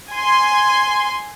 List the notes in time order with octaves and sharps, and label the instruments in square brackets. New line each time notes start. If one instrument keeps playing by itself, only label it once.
[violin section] G#5 C6